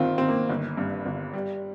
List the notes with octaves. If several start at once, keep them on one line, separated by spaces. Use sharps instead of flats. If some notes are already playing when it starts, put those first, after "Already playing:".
Already playing: G1 D#3 C4 F4
D#3 C4
A#3
G1
G2
G1
G3